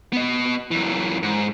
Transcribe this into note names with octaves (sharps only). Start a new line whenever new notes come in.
B3 D#5
F#2 E3
G#2